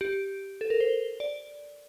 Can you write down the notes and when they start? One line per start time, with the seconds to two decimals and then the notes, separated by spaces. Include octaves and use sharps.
0.01 G4
0.61 A4
0.70 A#4
0.80 C5
1.20 D5